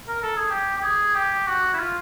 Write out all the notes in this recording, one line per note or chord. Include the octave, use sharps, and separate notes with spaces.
A#4
A4
G#4
G4
G4
G#4
G4
F#4
E4
F4